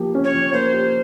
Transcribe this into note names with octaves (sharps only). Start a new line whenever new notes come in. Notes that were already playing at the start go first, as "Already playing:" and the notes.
Already playing: F3 A#3 G4
C#4
C#5
F3
A#3 C5
G4